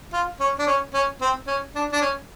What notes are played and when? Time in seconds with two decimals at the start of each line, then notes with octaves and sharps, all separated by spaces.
0.13 F4
0.40 C#4
0.59 D4
0.67 C#4
0.94 C#4
1.21 C4
1.47 C#4
1.75 D4
1.92 D4
2.01 C#4